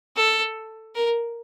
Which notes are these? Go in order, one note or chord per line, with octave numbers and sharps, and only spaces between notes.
A4
A#4